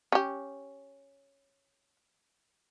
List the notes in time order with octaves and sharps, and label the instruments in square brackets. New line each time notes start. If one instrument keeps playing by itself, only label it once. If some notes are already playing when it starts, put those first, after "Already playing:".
[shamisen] C#4 G4